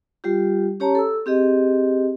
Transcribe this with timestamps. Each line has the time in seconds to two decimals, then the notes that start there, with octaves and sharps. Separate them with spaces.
0.24 G3 F4 G4
0.80 C#4 G4 C#5 A5 A#5
0.95 A4 E6
1.26 C4 G4 G#4 D#5